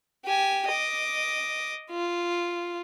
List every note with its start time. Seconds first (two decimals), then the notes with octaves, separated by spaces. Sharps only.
0.25 G4 G#5
0.67 D#5 D6
1.90 F4